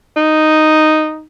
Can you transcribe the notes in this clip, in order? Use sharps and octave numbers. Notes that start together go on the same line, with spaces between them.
D#4